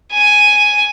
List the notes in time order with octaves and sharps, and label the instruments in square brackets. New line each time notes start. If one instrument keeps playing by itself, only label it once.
[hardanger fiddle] G#5